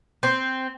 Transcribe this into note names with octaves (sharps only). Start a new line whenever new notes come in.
C4